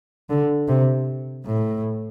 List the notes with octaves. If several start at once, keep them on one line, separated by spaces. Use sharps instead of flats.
D3
C3
A2